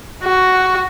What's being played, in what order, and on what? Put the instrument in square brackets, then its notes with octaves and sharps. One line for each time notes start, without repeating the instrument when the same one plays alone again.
[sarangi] F#4